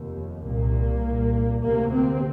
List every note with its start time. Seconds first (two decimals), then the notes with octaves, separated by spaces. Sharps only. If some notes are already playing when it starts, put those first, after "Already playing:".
Already playing: F1 D#2
0.43 C2 A#2 A#3
1.02 C2 A#2
1.62 D2 C3 A#3
1.92 C4